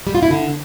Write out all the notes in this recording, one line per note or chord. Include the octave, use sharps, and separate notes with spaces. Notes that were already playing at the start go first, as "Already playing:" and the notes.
G3
F4
E4
D3